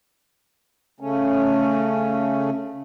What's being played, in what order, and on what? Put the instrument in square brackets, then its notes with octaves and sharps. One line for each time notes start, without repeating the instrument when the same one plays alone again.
[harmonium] C#3 A3 C#4